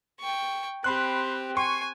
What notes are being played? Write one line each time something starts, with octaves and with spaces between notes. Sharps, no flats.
G5 C#6
C4 G4 B5 C6 F#6
G#5 C6 C#6